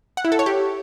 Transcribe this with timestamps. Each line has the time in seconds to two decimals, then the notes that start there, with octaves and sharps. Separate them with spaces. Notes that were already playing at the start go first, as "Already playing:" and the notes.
0.17 F#5
0.25 E4
0.32 A4
0.39 C#5
0.46 G4